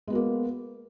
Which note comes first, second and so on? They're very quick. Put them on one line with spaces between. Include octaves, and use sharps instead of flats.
G#3 B3 F#4 A#3